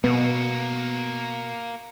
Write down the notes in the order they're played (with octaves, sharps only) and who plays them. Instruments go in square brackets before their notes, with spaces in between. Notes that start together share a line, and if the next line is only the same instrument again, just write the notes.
[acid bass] B2 [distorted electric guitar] A#3 F#4 [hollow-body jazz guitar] B3